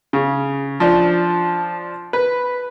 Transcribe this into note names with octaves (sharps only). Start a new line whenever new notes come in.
C#3
F3 D4
B4